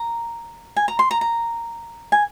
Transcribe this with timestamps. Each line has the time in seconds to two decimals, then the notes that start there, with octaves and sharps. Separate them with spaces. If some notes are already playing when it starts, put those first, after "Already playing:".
Already playing: A#5
0.76 G#5
0.88 A#5
0.99 C6
1.11 A#5
1.21 A#5
2.12 G#5